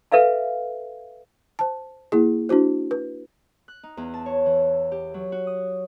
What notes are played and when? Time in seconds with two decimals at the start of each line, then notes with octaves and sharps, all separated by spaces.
0.12 A4 B4 E5 F5 G#5
1.59 C5 A5
2.12 A#3 E4 G#4
2.49 D4 E4 F#4 C5
2.91 B4
3.68 F#6
3.83 D#4
3.97 E2
4.14 A5
4.26 C#5
4.46 E3
4.92 G4
5.14 F#3
5.32 F#4
5.47 D#6